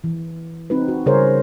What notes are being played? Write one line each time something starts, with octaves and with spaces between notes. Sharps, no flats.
E3
C4 D#4 F#4 B4
F#4
C#3 G3 G#4 A#4 C5 C#5